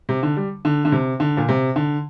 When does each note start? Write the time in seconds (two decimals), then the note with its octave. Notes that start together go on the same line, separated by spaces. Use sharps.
0.09 C3
0.23 D3
0.37 G3
0.65 D3
0.85 D3
0.92 C3
1.20 D3
1.37 A#2
1.49 C3
1.76 D3